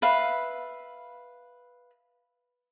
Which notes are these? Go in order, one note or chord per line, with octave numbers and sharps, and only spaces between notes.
B4 E5 F5